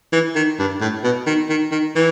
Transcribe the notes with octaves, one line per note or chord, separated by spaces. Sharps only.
E3
D#3
G2
A2
B2
D#3
D#3
D#3
E3